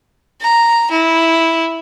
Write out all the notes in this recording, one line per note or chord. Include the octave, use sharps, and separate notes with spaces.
A#5
E4